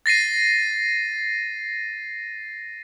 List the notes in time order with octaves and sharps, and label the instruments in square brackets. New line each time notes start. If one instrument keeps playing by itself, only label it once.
[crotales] A6 A#6 C7 D#7